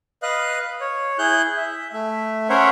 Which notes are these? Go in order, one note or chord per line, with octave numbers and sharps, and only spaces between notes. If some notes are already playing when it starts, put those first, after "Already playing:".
B4 D#5 F5 F#6
C#5
E4 G#4 F#6 G6
E5
A3 E5
C#4 A#4 C5 C#5 E5 F#5